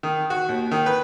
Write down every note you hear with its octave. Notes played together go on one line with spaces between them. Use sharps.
D#3
F#4
D#2
D#3
B4